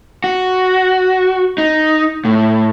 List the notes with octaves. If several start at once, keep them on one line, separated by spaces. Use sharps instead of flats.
F#4
D#4
A2